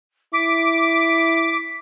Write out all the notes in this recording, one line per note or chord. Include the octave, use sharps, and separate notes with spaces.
E4 D6 B6